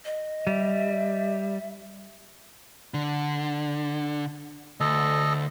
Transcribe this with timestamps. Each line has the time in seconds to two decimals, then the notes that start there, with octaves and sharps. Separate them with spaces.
0.05 D#5
0.47 G3 E5
2.94 D3
4.80 D2 A4 D#5